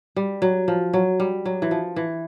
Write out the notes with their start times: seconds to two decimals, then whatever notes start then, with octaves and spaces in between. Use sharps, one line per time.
0.16 G3
0.42 F#3
0.68 F3
0.93 F#3
1.20 G3
1.45 F#3
1.62 E3
1.71 F3
1.96 E3